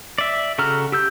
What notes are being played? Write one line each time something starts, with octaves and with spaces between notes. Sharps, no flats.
D5 E5
C#3 F#4 A4 A#5 F6
G4 E6 G6